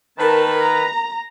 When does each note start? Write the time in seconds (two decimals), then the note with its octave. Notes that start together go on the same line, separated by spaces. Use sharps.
0.19 D#3 A#4 B4 A5
0.60 A#5